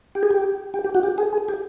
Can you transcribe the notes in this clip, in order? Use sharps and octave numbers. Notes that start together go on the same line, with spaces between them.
G4
G#4
G4
G4
G4
F#4
G4
G#4
G#4
G4